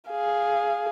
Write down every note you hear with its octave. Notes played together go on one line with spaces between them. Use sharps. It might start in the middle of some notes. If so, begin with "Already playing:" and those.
G#4 F5